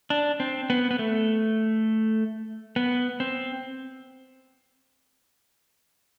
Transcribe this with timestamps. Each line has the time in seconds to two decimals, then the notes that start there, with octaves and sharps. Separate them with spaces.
0.10 D4
0.40 C4
0.70 B3
0.91 B3
0.99 A3
2.76 B3
3.20 C4